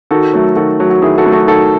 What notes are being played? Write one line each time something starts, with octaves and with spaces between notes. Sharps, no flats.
D#3 F#4 A4
F#3 A3
D#3 F#4 A4
F#3 A3
F#4
D#3 E4 G#4
F#4 A4
F#3 A3
F#4 A4
D#3 F#4 A4